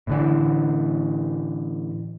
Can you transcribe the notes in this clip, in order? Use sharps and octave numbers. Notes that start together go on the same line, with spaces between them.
A2 D3 E3